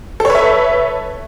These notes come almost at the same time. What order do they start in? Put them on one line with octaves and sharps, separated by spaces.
A4 C#5 B4 E5